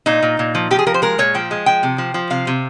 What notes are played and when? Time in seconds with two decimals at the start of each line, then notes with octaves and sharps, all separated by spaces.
0.06 A#2 D#4
0.23 A#2
0.39 A#2
0.55 F3
0.71 F3 G4
0.79 G#4
0.86 F3 A#4
0.94 C5
1.02 G#3 A#4
1.18 A#2 C#5
1.34 F3 G5
1.51 G#3
1.66 F3 G5
1.83 C3
1.98 F3
2.14 F3
2.30 C3 F5
2.47 C3